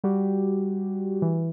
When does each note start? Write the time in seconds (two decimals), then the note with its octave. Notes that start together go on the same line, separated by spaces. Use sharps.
0.04 G3 F#4 G4
1.22 E3